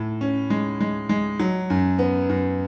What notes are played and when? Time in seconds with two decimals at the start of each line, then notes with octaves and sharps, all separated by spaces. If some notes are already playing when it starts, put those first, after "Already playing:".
Already playing: A2
0.21 C#4
0.50 G#3
0.80 G#3
1.09 G#3
1.40 F#3
1.70 F#2
1.99 B3
2.30 F#2